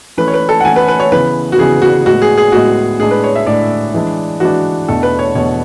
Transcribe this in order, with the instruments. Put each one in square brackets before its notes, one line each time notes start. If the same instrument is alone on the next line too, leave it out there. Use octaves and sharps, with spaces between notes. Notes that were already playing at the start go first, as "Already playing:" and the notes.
[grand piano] E3 A3 C#4 [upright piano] B4
[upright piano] C#5
B4
A4
F#5
[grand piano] E3 A3 C#4 [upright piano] G#5
[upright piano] B4
B4
C#5
[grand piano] C#3 E3 B3 [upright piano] B4
[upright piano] F#4
[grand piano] C#3 E3 B3 [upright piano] G#4
[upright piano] F#4
[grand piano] A2 G#3 B3 [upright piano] F#4
[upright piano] G#4
G#4
[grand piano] A2 G#3 B3 [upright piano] F#4
[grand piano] A2 G#3 D4 [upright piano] G#4
[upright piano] B4
C#5
E5
[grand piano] A2 G#3 D4 [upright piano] D5
[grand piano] E3 G#3 D4
[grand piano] E3 G#3 D4 [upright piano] F#4
[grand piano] E2 B2 A3 D4 [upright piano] A4
[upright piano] B4
C#5
[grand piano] E2 B2 A3 D4 [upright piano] C#5